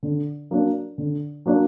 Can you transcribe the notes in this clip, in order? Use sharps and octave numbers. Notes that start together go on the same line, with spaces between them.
D3
F#3 A#3 D4
D3
F#3 A#3 D4